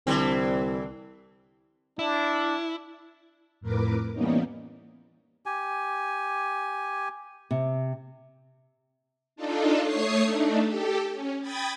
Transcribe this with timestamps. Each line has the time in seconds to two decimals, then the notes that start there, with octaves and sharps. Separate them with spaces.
0.07 C2 D3 E3 C4
1.99 D4 E4
3.61 F2 A2 A#4 B4 D6
4.13 E3 G3 A#3 B3 C#4 D#4
5.46 G4 G#5
7.51 C3
9.36 D4 D#4 F4 A4
9.82 A3 C#5 C#6 D#6 C7
10.25 A3 D4 D#4
10.63 G4 A4
11.12 C#4
11.42 G5 B5 D#6 G#6 A6